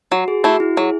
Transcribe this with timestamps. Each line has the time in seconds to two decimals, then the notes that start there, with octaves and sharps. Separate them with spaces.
0.11 F#3 F#4
0.28 G#4
0.44 A3 E4 F#4
0.60 E4
0.77 F#3 G#4